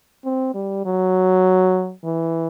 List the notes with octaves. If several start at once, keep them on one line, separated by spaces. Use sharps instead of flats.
C4
G3
F#3
E3